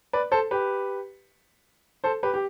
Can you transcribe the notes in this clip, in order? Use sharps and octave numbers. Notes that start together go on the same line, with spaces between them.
B4 D5
A4 C5
G4 B4
A4 C5
G4 B4
G4